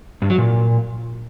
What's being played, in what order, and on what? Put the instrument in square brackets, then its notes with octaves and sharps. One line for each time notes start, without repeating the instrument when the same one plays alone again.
[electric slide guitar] G2
F#3
A#2